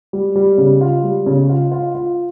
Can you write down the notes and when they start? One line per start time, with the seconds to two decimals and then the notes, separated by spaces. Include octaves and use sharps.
0.13 G3
0.36 G3
0.58 C#3
0.81 F4
1.04 G3
1.26 C#3
1.49 F4
1.72 F4
1.95 F4